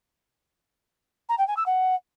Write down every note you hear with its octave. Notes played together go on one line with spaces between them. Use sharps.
A#5
G5
G#5
E6
F#5